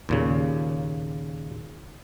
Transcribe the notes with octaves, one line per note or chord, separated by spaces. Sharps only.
D#2 A#2 C#3